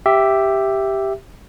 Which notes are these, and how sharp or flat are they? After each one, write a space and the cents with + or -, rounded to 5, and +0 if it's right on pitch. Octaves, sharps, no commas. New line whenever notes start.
G4 +0 E5 +5